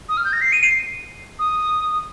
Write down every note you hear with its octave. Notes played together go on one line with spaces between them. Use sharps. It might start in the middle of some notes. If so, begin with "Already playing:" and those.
D#6
F6
G6
A#6
C7
D#7
C7
D#6